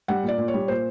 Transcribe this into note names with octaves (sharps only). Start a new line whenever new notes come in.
G3 F#5
A#2
D5
A#2
C#5
G3
A#2 C5